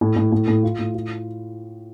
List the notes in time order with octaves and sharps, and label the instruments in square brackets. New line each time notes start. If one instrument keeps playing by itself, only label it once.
[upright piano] A2
A2
A2
A2
F4
A2
F4